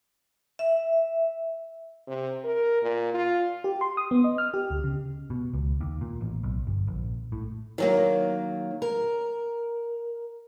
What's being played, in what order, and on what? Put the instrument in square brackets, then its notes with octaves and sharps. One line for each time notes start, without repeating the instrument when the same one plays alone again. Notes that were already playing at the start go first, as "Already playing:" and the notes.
[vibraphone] E5
[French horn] C3
A#4
A#2
F4
[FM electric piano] G4
C6
D#6
B3
D#5
F6
G4
D2
C#3
[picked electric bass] B2
C#2
D#2
A#2
A1
B1
G1
A#1
A2
[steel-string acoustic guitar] D#3 F#3 A#3
A#4